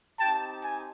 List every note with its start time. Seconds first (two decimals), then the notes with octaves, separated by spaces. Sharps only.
0.19 C4 D#4 G4 G5 A5
0.63 G#5